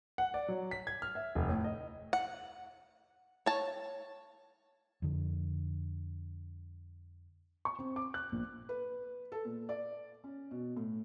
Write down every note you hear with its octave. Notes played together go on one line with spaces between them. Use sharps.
F#5
D5
F#3
B6
G#6
F6
E5
F1
A2
D#5
F#5
C#5 A5
F2 D3
C#6
C4
D6
F#6
A#1
B4
A4
A#2
D5
C#4
B2
A2